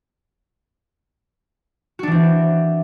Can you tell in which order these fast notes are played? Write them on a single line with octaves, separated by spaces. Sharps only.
F#4 D4 E3 C4